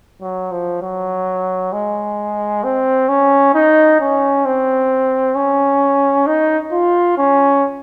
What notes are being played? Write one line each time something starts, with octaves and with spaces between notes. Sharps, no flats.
F#3
F3
F#3
G#3
C4
C#4
D#4
C#4
C4
C#4
D#4
F4
C#4